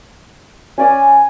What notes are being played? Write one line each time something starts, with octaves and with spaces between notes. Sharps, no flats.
C#4 D5 G#5